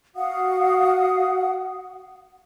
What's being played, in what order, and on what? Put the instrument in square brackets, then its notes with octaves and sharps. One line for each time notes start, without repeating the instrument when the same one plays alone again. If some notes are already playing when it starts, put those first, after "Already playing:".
[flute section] F#4 F5 F#5 D#6